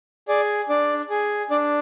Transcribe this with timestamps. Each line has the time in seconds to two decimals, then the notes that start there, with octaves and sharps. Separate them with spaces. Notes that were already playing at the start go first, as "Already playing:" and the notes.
0.28 G#4 D5
0.69 D4 D5
1.10 G#4
1.51 D4 D5